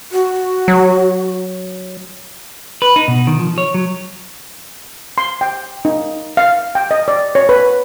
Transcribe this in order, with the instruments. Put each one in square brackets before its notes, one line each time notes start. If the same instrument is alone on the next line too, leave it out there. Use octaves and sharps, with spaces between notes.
[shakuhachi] F#4
[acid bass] F#3
[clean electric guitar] B4
D#4
B2
D#3
F3
C#5
F#3
[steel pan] C6
G5
D#4
F5
G5
D#5
D5
C#5
B4